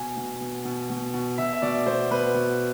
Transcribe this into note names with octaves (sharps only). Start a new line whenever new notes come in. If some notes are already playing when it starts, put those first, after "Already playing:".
Already playing: B2 G#5
B2
B2
B2
B2
B2
B2 E5
E5
B2 D5
B2 C5
B2 B4
B2